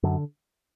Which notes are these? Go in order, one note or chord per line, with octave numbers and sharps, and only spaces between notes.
F#2 D3